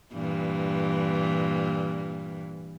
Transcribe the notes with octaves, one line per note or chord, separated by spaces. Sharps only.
G2 A#2 E3